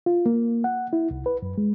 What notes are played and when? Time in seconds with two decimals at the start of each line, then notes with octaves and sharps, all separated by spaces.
0.06 F4
0.26 A#3
0.64 F#5
0.93 E4
1.11 C2
1.26 B4
1.42 F#2
1.58 G#3